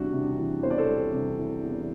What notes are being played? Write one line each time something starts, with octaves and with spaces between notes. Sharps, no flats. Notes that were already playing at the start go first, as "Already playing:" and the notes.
Already playing: E2 C3 E3 G3 D4 F#4
C3
E3
E2 C5
D5
A4 C5
G3
C3
E3
E2